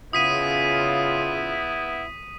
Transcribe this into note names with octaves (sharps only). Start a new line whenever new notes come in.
C#3 B3 E4 F4 D#6 B6 D#7